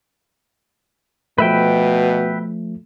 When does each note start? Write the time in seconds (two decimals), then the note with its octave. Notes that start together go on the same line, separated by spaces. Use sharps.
1.38 B2 F3 A3 B4 E5 G5